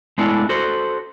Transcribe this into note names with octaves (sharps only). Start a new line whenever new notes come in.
G#3 A3 B3 D4 E4
F#4 A4 C5